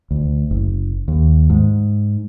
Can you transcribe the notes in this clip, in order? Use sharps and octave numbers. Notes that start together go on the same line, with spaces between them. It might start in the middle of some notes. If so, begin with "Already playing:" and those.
D2
F#1
D#2
G#2